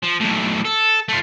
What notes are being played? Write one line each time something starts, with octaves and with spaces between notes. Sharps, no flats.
F3
B1 A2
A4
A3 F4